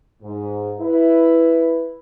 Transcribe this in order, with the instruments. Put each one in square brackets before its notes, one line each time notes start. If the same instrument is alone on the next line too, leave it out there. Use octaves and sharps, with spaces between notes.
[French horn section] G#2
E4 B4